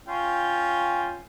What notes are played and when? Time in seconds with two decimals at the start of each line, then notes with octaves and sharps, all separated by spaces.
0.07 C#4 F4 G5